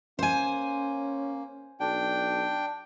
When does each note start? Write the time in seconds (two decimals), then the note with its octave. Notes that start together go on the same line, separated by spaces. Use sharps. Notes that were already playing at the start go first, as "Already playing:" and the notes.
0.19 A#3 C#4 C5 G#5
1.80 B1 D4 G5